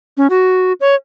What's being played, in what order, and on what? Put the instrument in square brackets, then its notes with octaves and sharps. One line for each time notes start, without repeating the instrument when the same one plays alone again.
[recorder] C#4
F#4
C#5